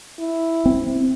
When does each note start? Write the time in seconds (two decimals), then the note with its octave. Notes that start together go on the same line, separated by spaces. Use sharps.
0.19 E4
0.66 C4